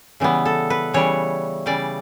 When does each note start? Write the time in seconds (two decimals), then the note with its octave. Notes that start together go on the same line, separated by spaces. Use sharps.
0.20 C#3 E3 G3 B3
0.45 A4
0.70 B4
0.94 C#3 E3 G3 C#5
1.66 C#3 E3 G3 D5